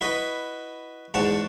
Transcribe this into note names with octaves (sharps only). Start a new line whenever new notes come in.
E4 F#4 B4 D#5
E2 G#2 F#4 F#5 A5